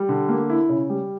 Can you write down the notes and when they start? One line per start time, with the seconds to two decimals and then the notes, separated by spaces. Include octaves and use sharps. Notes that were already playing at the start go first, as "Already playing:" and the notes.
Already playing: G3
0.09 D3
0.29 A#3
0.50 E4
0.69 C#3
0.90 G3